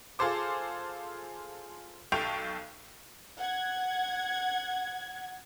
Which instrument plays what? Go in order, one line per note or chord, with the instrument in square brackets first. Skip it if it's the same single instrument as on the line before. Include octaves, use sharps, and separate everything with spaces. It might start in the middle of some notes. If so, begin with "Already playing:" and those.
[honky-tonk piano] F4 G#4 A4 C5 D6
B1 A4 G5 C#6 F7
[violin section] F#5 G#6